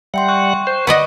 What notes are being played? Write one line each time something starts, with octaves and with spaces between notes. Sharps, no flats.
G3 E5 F#5 G5 C6
C#6 F#6
C5
B4 D5 D#5 F#5